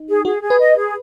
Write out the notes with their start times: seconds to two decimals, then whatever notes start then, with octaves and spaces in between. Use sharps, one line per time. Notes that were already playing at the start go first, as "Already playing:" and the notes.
Already playing: D#4
0.08 G#4
0.25 F#4 G#4
0.43 G#4
0.50 B4
0.59 D#5
0.77 G#4